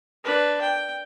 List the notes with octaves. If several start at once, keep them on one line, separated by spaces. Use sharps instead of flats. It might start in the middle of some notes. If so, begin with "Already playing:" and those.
D4 B4
G5